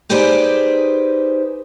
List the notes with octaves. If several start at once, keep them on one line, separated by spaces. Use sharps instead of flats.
D#4 G4 G#4 B4 C5 D5